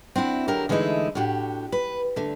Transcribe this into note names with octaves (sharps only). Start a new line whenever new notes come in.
C4 D4 E4 F#4
D3 F#3 E4 G4 A#4
D3 E3 G#3 A3 D#4 E4
A2 D4 F#4 G4
B4
D3 A3